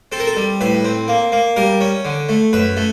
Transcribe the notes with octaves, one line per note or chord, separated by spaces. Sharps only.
C4 A4
A#4
A4
G3
A2 B4
C4
A#3
A#3
G3 A#4
C#4
D3
A3
F#2 B4
A3